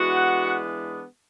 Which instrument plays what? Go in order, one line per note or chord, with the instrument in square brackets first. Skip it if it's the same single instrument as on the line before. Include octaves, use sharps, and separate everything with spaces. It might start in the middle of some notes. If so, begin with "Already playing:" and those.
Already playing: [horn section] E3 G#3 B3 D4 F#4 F#5